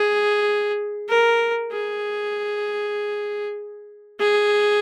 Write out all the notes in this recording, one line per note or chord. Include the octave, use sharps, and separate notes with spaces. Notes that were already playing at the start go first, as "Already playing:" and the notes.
Already playing: G#4
A#4
G#4
G#4